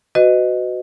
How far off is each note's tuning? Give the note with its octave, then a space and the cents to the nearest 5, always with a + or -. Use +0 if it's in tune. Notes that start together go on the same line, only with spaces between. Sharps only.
F#4 +0 B4 +35 D#5 -5